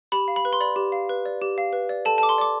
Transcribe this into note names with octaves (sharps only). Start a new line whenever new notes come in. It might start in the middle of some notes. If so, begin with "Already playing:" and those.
G4 B5
F5
B5
B4
C6
D5 B5
G4
F5
B4
D5
G4
F5
B4
D5
A4 A5
A5
A4 D6
C6
D5 D6